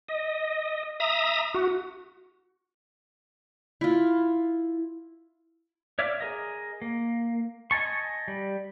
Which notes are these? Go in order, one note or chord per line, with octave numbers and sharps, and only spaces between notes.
D#5
E5 A#5 D#6
F#4
E4 F4
C#5 D5 E5 F5 D6
G#4 A#4 D#5
A#3
D#5 G#5 A5 C#6
G3